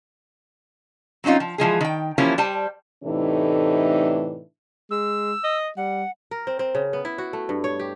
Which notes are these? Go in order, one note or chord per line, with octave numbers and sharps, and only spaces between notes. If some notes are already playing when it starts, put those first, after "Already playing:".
F#3 C4 C#4 D#4 F4
F3
E3 F3 G#3 G#4
D#3 G5
E3 F3 A#3 C#4 E4 G4
G3 C5 G5 A5
A2 C3 E3 A3 D4 D#4
G#3 E6
D#5
G3 F#5
A#4
C4
C4
C#3
B3
E4
F#4
A3
G2
C#5
G4